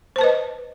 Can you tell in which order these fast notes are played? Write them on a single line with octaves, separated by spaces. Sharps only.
C5 A5 B4 D#5